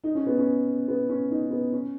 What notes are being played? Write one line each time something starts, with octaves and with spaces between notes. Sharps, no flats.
D#4
C#4
B3
C#4
B3
C#4
D#4
B3
C#4